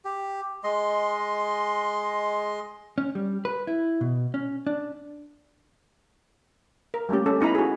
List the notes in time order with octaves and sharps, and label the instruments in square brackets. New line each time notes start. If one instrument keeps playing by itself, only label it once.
[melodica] G4
G#3 D#5 C6
[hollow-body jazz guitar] C#4
G3
B4
E4
B2
C#4
D4
[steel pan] A#4
G3 A3 A#3 C#4 G4
C#4 A4
B3 D#4 E4 A#5 B5
F#4 G#4